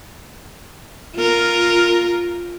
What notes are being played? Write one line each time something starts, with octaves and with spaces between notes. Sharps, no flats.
F4 A#4